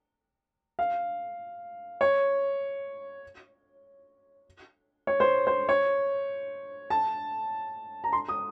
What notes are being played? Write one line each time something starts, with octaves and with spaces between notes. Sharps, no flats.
F5
C#5
C#5
C5
C5
C#5
A5
A#5
C6
D#6